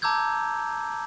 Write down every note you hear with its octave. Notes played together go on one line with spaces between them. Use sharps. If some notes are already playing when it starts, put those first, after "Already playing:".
A5 A#5 D6 E6 G6 G#6